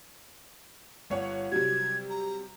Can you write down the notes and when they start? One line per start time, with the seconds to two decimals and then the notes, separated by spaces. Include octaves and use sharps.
1.10 G1 C#5 F#5
1.52 C3 F#3 G3 G#6
2.10 A#5